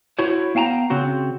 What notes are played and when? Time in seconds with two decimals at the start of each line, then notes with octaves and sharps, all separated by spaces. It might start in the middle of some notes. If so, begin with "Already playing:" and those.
0.19 E4 F#4 C5 C#5
0.55 B3 F5 G5 A5 A#5
0.90 C#3 C4 F#4